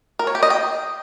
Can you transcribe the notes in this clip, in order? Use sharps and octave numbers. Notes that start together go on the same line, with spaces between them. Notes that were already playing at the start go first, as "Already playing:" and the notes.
A#4
C#5
G4
D#5
G5